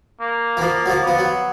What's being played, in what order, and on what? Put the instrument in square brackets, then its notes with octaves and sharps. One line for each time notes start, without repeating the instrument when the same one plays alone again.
[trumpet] A#3
[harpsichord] E3
[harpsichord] F3 [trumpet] A#3
[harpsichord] F#3
F3
[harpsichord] F3 [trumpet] B3
[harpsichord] F#3